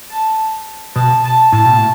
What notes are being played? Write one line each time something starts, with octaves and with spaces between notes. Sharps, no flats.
A5
B2 A5
A5
A2 A5
B2
A2